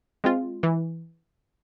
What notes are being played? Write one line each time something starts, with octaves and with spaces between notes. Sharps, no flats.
G#3 C4 F4
E3